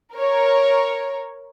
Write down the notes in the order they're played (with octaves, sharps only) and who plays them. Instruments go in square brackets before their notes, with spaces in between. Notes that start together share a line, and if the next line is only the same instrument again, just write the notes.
[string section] A#4 C#5